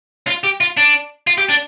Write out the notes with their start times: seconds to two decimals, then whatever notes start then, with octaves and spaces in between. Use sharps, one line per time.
0.27 F4
0.44 G4
0.61 F4
0.77 D4
1.27 F4
1.38 G4
1.49 D4